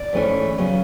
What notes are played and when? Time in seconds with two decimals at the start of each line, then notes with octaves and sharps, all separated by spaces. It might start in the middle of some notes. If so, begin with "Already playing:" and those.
Already playing: D5
0.13 G#2 E3 A3 C#4
0.58 C#3 F#3 B3